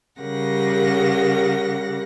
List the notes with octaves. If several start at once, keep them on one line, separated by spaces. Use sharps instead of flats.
C#3 G3 G4 A#4 F#5 A#6